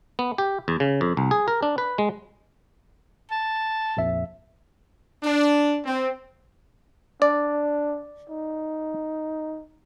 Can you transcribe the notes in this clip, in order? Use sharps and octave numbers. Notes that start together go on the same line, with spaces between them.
B3
G4
E2
C#3
F2
C2
G#4
A#4
D4
B4
G#3
A5
A#1 F2 E5
D4
C4
D4 D5
D#4